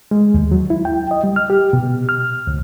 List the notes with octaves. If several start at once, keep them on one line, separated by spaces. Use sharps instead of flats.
G#3
D#2
F#3
E4
G5
D#5
G3
F6
G4
B2
F6
D2